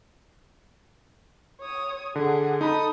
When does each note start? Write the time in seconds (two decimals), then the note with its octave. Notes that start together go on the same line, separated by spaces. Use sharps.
1.61 C#5 D#6
2.15 D3 G#4 F#5
2.61 D#4 A4 B5 D#6